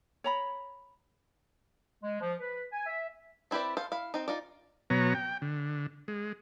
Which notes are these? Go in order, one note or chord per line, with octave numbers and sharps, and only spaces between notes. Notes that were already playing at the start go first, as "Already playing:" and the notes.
C#5 A#5 B5
G#3
F3
B4
G#5
E5
C4 E4 G4 B4 D5
A4 C5 F5
E4 F5
C4 D#4
D#4 F4 D5
B2 F#3 B3 C#5 A#5
G5
D3
G#3